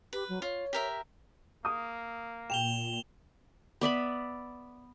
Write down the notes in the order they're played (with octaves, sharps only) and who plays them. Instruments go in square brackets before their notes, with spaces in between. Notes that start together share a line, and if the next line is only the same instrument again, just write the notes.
[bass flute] G4 [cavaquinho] B4
[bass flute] F#3
[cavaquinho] F4 [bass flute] C#5
[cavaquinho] G4 A#4 E5
[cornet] A#3 [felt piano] D#6
[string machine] A#2 [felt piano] G5 [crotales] E7 F7 G7
[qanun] B3 D5 E5 B5